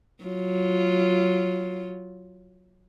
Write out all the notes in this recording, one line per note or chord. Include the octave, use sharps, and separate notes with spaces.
F#3 F4